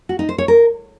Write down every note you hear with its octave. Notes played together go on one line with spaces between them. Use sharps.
F#4
D#4
C5
C#5
A#4